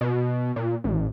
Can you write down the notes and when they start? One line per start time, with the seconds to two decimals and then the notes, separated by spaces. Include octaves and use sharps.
0.01 B2
0.56 A#2
0.84 A1